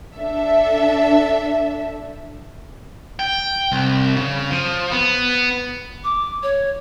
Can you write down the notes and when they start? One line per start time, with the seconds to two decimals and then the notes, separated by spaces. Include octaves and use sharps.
0.15 D4 A4 E5
3.19 G5
3.72 C2
4.16 C#3
4.51 F3
4.91 B3
6.04 D6
6.43 C#5